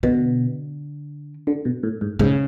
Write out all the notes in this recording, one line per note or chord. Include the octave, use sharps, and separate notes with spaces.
B2 D3
D3
B2
A2
G#2
G#2 C#3